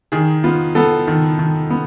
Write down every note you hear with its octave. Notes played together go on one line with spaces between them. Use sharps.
D#3 G#4
B3 F4
B3 A4
D#3
D#3
B3